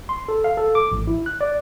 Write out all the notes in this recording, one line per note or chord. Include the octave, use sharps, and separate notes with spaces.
C6
A4
F5
A4
D6
A1
E4
F#6
D5